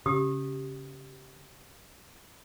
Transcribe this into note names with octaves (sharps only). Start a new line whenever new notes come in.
C#3 G4 D#6